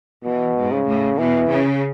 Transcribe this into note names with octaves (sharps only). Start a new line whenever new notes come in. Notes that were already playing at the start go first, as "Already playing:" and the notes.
B2 E3
G#2
C#3
A2
B2 E3
C#3